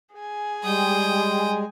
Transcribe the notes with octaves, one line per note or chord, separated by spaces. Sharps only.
G#4 G#5
G3 G#3 G5 D#6